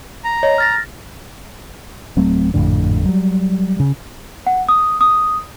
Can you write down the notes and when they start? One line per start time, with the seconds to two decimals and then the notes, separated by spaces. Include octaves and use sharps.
0.24 A#5
0.43 C#5 D#5
0.58 F6 A6 A#6
2.16 D1 F#3 A3 C4
2.54 G#1 F2 A2 D3
3.05 F#3 G3
3.80 C#3
4.47 F#5
4.69 D#6
5.01 D#6